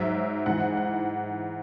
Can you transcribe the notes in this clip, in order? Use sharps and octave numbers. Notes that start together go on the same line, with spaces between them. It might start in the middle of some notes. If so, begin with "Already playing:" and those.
Already playing: G#2 F#3 E5
G#2 E3 F#5
F#5